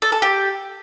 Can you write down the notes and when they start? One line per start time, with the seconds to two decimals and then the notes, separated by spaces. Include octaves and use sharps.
0.02 A4
0.12 A4
0.22 G4